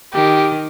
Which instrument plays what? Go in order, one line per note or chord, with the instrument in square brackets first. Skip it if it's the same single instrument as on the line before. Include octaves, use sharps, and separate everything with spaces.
[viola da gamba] D#3 [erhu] G4